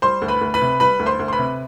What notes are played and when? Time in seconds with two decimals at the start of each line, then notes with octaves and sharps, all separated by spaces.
0.02 G3 C5 C6
0.22 D2
0.28 B4 B5
0.41 D2
0.54 B4 B5
0.62 C3
0.80 G3 B4 B5
1.00 D2
1.06 C5 C6
1.19 D2
1.28 C6
1.33 B4 B5
1.39 C3